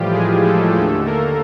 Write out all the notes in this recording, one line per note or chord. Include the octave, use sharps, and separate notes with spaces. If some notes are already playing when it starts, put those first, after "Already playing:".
Already playing: A2 E3 F3 G3 F4 G4
G#3 G#4
A3 A4
D#2 D3 A3 A4
A#3 A#4